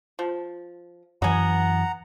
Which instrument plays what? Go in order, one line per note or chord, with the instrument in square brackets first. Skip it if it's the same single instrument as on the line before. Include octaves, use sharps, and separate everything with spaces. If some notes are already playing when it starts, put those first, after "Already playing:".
[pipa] F3
[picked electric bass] F#2 E3 [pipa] B3 G#5 [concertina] F#5 A#5